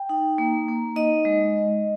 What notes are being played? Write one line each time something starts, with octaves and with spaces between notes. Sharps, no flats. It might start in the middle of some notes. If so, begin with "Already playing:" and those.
Already playing: G5
D#4
A#3
A#3
D#4 D#5
G#3